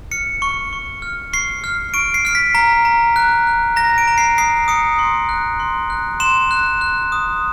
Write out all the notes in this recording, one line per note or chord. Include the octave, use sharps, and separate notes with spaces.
F6 C#7
C#6
C#6
F6
C#6 C7
F6
C#6 D7
C7
F6 C7
B6
A#5 B6
A#5
F#6
F#6
A#5 A#6
D7
A#5
C7
D#6 C7
D#6 C#7
C6
F#6
C6
F#6
C6 E7
F#6
F#6
D#6